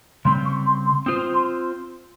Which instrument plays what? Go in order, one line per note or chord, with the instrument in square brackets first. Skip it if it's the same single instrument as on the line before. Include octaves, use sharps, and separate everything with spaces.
[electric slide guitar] C#3 G3 C4 [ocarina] C6
[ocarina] C#6
C6
C6
[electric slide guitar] C4 F4 C5 [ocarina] D#6
[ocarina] C6